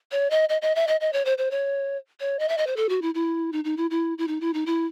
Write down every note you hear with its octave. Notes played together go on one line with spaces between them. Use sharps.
C#5
D#5
D#5
D#5
E5
D#5
D#5
C#5
C5
C5
C#5
C#5
D#5
E5
D#5
C5
A4
F#4
E4
E4
D#4
D#4
E4
E4
E4
D#4
E4
D#4
E4